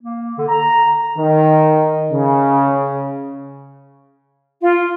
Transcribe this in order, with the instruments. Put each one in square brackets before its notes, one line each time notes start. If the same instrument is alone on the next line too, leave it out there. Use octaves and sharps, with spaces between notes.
[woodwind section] A#3
D3
A#5
[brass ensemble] D#3
C#3
[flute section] F4